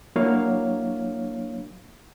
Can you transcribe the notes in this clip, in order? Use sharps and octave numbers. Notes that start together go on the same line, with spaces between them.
F#3 A#3 D4 E4 C#5 F5